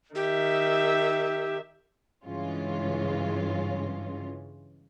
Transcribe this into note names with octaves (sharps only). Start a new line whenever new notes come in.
D#3 G4 E5
G2 C#3 E3 G#3 C#4 F4